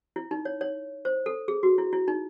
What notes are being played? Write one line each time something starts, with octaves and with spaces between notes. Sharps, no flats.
E4
D#4
C#5
C#5
C5
A4
G#4
F#4
E4
E4
D#4